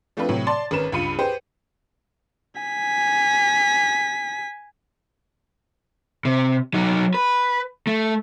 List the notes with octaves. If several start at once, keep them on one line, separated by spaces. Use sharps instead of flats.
F3 A3 C4 D4 F4 B4
A2 C3 F#3
D5 A5 C6 A6
G#1 C#4 A#4 B4 E7
C#2 G2 F4 B5 C#7 D#7
G4 G#4 B4 C5
G#5 B6
C3
F#3 D#4
B4
A3